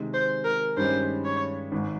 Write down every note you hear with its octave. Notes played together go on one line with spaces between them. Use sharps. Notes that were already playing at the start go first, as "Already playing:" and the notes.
Already playing: C3 D#3 G#3
C5
A#4
G2 D#3 G#3 C#4 G4 C5
C#5
G#1 G#2 D#3